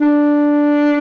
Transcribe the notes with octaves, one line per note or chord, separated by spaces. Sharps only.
D4